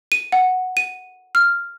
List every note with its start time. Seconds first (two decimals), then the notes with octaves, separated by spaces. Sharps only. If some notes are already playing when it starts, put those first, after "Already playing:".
0.12 D#7
0.32 F#5
0.77 D#7
1.35 F6